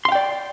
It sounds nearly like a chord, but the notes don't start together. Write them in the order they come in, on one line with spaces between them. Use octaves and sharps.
C6 F5 G5 D5